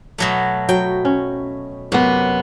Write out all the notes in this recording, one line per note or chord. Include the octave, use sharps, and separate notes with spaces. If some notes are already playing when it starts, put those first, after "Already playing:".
B2 F#3 A3
F#3 G5
C#4
F#2 C3 B3